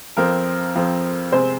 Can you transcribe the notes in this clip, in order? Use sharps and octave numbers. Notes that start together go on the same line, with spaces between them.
F2 F3 C4 A#4
F2 F3 C4
C3 G#3 C4 C5